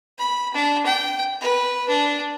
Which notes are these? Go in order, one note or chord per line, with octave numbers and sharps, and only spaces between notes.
B5
D4
G5
B4
D4